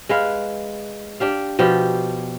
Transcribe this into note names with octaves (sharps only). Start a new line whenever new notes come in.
G#3 B4 F5
D4 G4 F5
B2 F3 G4